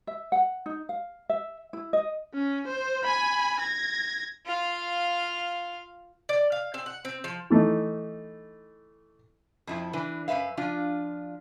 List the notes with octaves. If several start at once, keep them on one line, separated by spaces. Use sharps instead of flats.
E5
F#5
D#4
F5
E5
E4
D#5
C#4
C5
G#5 B5
G#6 A#6
F4 F5
D5
F5
C4
F#5
C4
F3
E3 A3 D#4
F2 F3 E4
E3 D4 B4
F#2 D#3 B4 E5 F5
F3 D4 F4